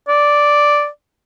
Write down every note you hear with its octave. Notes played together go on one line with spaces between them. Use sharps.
D5